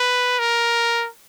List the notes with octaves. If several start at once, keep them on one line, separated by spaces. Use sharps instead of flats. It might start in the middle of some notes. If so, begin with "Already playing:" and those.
Already playing: B4
A#4